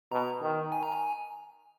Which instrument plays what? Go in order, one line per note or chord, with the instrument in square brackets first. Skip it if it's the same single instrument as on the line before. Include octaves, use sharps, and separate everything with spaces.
[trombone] B2 [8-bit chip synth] A#5
[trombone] D#3
[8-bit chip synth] G#5
A#5
G#5